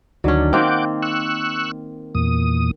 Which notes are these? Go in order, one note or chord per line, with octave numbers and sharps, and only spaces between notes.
D2 D#3 F#3 C#4 D4
D#3 A#3 C4 F#5 G5 D6
C#6 E6 F#6
E2 A#2 D#6